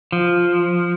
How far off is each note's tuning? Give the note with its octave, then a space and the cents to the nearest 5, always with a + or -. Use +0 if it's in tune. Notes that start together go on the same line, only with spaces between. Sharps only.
F3 +0